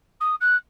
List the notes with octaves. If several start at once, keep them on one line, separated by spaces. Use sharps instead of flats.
D#6
F#6